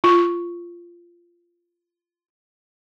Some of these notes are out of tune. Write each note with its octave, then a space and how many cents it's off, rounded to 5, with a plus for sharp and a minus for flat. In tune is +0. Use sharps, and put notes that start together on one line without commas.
F4 -15